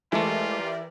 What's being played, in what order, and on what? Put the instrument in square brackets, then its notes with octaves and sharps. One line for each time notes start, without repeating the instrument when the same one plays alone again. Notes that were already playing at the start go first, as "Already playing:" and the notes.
[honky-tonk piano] E3 [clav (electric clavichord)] G#3 A3 [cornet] F4 [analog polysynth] G4 A#4 D5